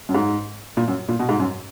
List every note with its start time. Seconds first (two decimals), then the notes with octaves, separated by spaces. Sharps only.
0.09 F#2
0.15 G#2
0.77 A#2
0.88 F#2
1.09 A#2
1.19 B2
1.29 G#2
1.40 F#2